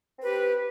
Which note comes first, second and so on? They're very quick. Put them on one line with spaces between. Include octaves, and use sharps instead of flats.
C4 B4 G4